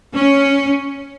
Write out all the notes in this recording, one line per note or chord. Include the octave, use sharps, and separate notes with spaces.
C#4